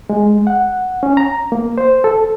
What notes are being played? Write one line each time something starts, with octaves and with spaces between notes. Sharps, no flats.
G#3
F#5
C#4
A#5
A#3
C5
A4